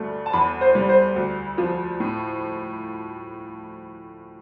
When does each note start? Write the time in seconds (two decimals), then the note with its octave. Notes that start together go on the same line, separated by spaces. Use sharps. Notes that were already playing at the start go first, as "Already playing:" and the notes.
Already playing: D2 G2 A3
0.26 A5
0.33 E2 B5
0.61 C5
0.75 G3
0.89 C5
1.16 D2
1.58 F3
2.00 A2